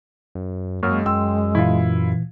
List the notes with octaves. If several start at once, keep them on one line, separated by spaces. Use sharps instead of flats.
F#2
F#2 G#3 A#3 C#6 F6
F#2 G5 C6 E6
A#2 E3 E4 F4